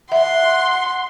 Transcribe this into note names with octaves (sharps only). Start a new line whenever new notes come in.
E5 F#5 C6